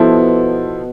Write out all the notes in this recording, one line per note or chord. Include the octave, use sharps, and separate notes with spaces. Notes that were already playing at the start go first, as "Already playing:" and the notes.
Already playing: B2 F3 B3 E4 A4 C5